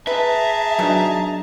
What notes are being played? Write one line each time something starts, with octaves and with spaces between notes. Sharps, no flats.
G#4 B4 E5 A5 A#5
B2 D#3 F#3 D4